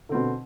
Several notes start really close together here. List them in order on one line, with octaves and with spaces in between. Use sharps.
D3 C4 B2